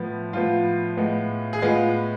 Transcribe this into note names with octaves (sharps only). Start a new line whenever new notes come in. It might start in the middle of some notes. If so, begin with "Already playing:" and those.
Already playing: A2 F3 B3
A2 F3 B3 F4
A2 G#3 B3
G#4
A2 G#3 B3 F4